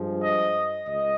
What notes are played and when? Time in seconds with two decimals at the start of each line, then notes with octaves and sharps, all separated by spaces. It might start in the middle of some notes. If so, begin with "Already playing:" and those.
Already playing: G2 F3 G#3
0.22 D#5
0.87 C#2 D#5